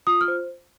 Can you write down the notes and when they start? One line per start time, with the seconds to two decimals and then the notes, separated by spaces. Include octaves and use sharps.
0.07 F4 D#6
0.21 F6
0.28 C5